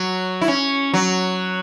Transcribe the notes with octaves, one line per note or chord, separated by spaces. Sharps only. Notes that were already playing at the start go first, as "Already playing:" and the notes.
Already playing: F#3
E4
C#4
F#3